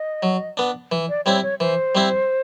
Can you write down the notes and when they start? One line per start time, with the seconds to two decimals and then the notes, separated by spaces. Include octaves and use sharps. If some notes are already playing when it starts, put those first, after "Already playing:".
Already playing: D#5
0.23 F#3
0.57 B3 D4
0.92 E3
1.09 D5
1.25 G3 C4 E4 C#5
1.43 C#5
1.60 E3 C5
1.95 G3 C4 E4